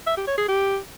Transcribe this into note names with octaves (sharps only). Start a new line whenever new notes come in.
E5
G4
C#5
G#4
G4